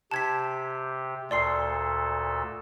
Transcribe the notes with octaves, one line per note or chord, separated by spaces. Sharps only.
C3 G4 A5 G#6 B6
D2 A#2 A4 D5 C6 C7